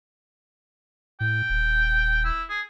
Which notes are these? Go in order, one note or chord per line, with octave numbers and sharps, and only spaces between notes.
A2 G5
D#1
E4
G#4